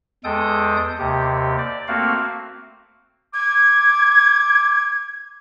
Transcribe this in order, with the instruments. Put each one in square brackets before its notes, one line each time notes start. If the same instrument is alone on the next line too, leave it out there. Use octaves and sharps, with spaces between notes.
[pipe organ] E2 G#3 A4 G5 D#6 G6
D#2 C3 G4
D5
A3 A#3 C4 F#4 F5
[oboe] D6 [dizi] G#6